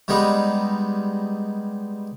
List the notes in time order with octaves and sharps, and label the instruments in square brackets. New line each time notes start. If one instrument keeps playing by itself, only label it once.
[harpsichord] G3 G#3 B3 D#4